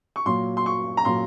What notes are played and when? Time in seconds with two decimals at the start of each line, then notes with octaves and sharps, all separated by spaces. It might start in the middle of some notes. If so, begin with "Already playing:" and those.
0.16 C#6
0.25 A#2 F#3 A#3 C6
0.57 C6
0.66 C#6
0.97 A#5
1.05 A#2 F#3 A#3 C6